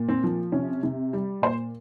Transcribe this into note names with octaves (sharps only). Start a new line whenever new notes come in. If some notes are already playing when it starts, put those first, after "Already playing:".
Already playing: A#2
C4
F3
C3 C#4
C3
G3
A#2 C5